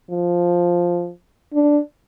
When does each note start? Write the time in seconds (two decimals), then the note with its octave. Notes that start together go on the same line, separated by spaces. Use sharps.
0.11 F3
1.53 D4